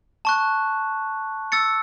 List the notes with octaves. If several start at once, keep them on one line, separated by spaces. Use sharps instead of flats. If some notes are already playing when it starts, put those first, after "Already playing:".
A5 C#6 F#6
E6 A6 C#7